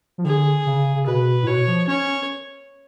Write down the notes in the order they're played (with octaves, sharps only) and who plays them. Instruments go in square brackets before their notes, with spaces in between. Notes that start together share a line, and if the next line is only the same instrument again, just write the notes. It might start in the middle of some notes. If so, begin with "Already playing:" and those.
[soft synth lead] F3
[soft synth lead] D3 [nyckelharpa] G#4
[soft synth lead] C#3
C#3
[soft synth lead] B2 [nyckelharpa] B4
[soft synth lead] A2
[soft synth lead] B2 [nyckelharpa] C#5
[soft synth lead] F3
[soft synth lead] C#4 [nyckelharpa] C#5